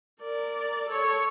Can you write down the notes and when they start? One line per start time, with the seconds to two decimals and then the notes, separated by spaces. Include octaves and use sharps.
0.22 A#4 D5
0.89 A4 C#5